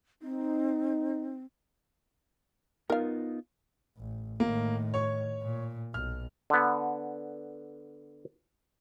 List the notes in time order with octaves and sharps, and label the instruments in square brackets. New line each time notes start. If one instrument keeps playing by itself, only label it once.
[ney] C4 [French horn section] D#4
[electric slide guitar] B3 D#4 F4 [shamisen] A#4 F5
[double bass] A1
[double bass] A2 D#3 [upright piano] A#3
[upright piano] C#5 C#6
[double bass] A#2
[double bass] B1 [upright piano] F6
[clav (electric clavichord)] D3 B3